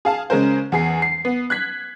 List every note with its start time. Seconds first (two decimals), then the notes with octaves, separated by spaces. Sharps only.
0.05 G#4 F5 A5
0.30 C#3 G#3 C#4 A#4 C5
0.72 E2 G#4 C7
1.02 C7
1.25 B3
1.50 F#6 G#6 B6